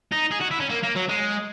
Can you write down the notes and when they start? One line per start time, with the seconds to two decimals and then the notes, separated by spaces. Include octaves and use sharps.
0.12 D#4
0.31 G#4
0.40 F#4
0.51 E4
0.60 C#4
0.69 A#3
0.83 A#3
0.95 F#3
1.09 G#3